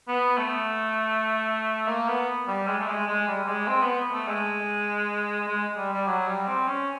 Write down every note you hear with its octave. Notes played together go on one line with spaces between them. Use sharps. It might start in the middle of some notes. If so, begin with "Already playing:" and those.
B3
A3
A#3
B3
G3
G#3
A3
G#3
G#3
G3
G3
G#3
C4
B3
A3
G#3
G#3
G3
G3
F#3
G3
C4
C#4